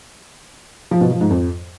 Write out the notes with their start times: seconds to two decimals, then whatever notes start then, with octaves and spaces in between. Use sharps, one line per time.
0.91 F3
1.01 B2
1.11 F3
1.21 G#2
1.30 F2